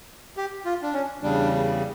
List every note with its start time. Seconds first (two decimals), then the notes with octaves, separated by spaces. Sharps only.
0.37 G4
0.66 F4
0.83 D4
0.94 C#4
1.22 E2 C#3 G3 D4